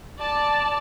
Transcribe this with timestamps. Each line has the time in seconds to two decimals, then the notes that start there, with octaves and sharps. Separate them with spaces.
0.19 D5 A5